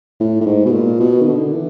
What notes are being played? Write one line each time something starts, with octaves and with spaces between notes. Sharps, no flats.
A2
A2
G#2
B2
A#2
B2
D#3
D3
E3